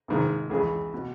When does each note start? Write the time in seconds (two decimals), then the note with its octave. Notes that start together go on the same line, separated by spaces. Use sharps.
0.08 G#1 G#2 D#3
0.50 C#2 C#3 E3 G#4
0.94 B2